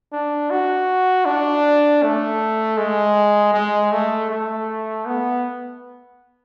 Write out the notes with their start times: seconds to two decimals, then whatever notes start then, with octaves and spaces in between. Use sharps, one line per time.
0.13 D4
0.51 F#4
1.26 D4
2.03 A3
2.78 G#3
3.54 G#3
3.92 A3
4.31 A3
5.06 B3